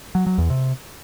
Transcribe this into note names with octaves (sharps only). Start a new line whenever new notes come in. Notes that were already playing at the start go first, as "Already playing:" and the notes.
F#3
F#3
E2
C3